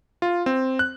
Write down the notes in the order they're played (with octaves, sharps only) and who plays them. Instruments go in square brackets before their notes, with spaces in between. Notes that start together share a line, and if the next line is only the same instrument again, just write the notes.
[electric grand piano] F4
C4
F#6